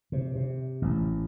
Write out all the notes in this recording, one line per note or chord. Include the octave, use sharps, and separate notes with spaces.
C3
C3
A1